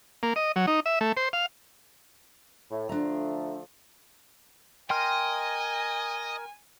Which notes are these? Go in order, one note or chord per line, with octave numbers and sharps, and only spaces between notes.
A#3
D#5
F#3
D#4
E5
A3
C5
F5
A2
D3 F3 A3 D4 A#5
A#4 D#5 G5 G#5 C6 F6